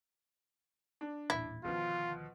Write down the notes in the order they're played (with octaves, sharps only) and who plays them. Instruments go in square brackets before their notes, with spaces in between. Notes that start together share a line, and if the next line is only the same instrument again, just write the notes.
[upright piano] D4
[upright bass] D#1 A1 [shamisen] E4
[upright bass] D2 D#3 [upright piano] B2 F3 [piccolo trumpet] F4